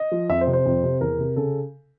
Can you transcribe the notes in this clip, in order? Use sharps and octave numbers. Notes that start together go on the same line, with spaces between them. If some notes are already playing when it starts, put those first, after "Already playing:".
Already playing: D#5
F3
F2 E5
C5
C3
C5
F2
C3
E2 A#4
C3
C#3 A4